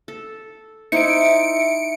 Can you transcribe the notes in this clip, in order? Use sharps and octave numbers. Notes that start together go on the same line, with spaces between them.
A4
D#4 E4 C5 E5 C#7 D7